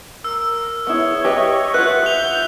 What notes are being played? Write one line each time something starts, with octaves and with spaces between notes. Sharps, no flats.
A#4 E6
B3 E4 G#4 C#5
G4 B4 D#5 E5
F4 B4 E5 F#5 F#6
G6 F7